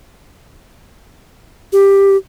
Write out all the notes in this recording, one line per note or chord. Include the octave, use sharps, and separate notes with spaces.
G4